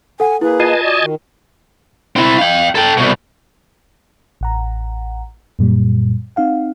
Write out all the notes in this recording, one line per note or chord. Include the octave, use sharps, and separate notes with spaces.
A4 F#5 G#5
A#3 E4 G#4 B4
F4 D#5 G#5 A5 C7 D#7
F#4 D5
D#3
C4 E4
F5 G5
A4 G5
C2 B2
A1 F#5 A#5
F#2 A#2 G3
C4 D#4 F5 F#5